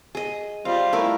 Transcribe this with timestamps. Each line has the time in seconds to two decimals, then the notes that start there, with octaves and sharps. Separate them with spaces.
0.15 G#4 D#5
0.65 G3 C4 F4 F5
0.93 A3 E4 A#4